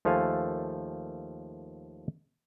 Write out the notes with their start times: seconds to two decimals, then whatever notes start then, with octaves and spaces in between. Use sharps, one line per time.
0.05 D#2 F3 A3 A4 F5 G#5